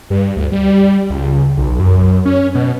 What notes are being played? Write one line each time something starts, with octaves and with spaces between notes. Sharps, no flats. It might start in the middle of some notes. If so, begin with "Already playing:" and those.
G2
D2
G3
C#2
B1
F#2
C#4
B2